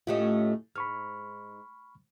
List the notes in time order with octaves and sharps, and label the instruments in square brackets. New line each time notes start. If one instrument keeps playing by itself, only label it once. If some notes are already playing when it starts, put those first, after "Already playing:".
[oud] A2 A3 C#4 [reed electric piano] F4 G4 D#5
[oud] G#2 [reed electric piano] B5 C#6 F6